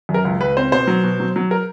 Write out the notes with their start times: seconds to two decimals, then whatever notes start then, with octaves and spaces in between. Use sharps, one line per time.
0.09 F#2
0.14 A#4
0.25 C#2
0.41 C#2 B4
0.57 C4 C5
0.72 B2 C5
0.87 F#3
1.04 B2
1.20 F#3
1.36 F#3
1.51 A#4